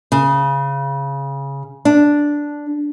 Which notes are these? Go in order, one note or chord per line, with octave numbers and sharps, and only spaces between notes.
C#3
D4